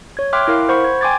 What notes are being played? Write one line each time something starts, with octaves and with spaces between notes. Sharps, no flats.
C#5 G#6
E5 G5 C6 D6 F6 F#6
E4 A#4 F5
C5 F#5 B5 C#6
G#6
G5 G#5 C6 D6 G#6 A6